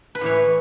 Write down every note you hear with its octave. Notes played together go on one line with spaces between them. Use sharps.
B4
A2 E3 C#5